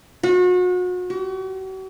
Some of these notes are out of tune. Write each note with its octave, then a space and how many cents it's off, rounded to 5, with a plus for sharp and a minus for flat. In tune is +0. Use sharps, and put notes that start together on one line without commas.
F#4 -35
F#4 +45